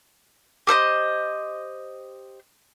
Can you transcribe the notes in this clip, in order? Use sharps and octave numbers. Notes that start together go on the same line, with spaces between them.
G4 A4 C5 D#5